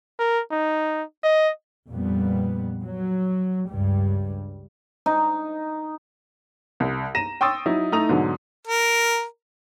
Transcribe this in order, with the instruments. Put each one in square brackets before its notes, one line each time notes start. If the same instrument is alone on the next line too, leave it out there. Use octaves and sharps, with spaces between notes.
[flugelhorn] A#4
D#4
D#5
[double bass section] F2 A#2 G3 B3
F#3
C#2 G2 G3
[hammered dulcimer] D#4
[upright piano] C2
A#5 A#6 D#7 E7
G5 C6 C#6 D#6 E6 A6
F#3 D#4 E4
A3 D#4 E4 A#5 D#6 F7
G#2 B2 D3 F#3
[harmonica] A#4